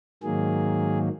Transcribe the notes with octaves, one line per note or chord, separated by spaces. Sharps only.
G#2 D#3 F#3 A#3 G#4